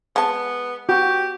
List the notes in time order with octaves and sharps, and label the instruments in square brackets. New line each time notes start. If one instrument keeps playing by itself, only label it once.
[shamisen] G#3 A5 [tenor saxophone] B3
[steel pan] F#4 [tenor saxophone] G4